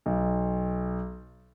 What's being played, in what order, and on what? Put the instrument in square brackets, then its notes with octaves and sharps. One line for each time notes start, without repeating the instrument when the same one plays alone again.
[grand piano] B1